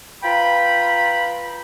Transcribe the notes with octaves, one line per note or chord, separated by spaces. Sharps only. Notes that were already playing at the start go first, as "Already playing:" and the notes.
F4 B4 G5 A#5 B5